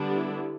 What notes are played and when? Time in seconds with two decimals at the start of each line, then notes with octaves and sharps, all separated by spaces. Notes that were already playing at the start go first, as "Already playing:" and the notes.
Already playing: D3 G3 B3 D4
0.14 E4